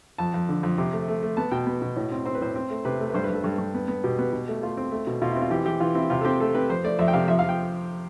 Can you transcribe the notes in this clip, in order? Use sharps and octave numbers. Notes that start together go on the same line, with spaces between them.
F2 A5
F2
D3
F2
C3
A3
A3
A3
B3 A5
B2 G5
B3
B2
A2
C4
C4 C5
B4
A2 C5
C4
A3
C3 B4
A3
B4
G2 C5
B4
G2 A4
G2 A4
G2
B3
B3
B2 G4
B3
B2
A3
A3 F4
C4
A3
B2
B2 F4
E4
C4
F4
E3 G4
E3 G4
E3 F4
C4 E4
C3 F4
A4
C4 G4
A3 A4
C4 B4
F2 C5
A3 D5
F2 E5
G5
C3 F5
F3 E5
F5
F3
G5